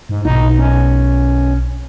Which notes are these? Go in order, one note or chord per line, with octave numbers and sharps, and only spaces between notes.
G#2
B1 D#4
C#4